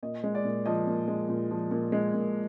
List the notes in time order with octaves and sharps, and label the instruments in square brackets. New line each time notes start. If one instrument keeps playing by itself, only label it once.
[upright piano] A#2 D#5
G#3
D5
A#2
F3 D#5
A#2
G#3
A#2
F3
A#2
G#3
A#2